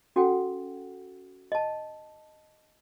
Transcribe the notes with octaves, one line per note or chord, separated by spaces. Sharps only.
C#4 F#4 A4 F#5 G5
D#5 A5